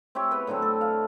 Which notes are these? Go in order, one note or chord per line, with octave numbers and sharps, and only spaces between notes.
C4 E4 G4 C#5
B3 G#4 B4
A2 D3 F#3 C4
A4
F5